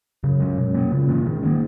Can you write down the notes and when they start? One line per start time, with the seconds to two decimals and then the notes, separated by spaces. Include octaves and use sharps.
0.24 F#2 C#3
0.40 G#3 C#4
0.58 B2
0.74 A#3 C#4
0.92 A#2 C#3
1.09 E3 G#3 C#4
1.26 G#2 D#3
1.43 A#3 C#4